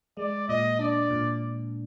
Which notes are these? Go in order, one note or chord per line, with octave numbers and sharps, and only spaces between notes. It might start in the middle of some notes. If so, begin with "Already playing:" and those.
G#3 D5
A#2 D#5
D4 D5
A#2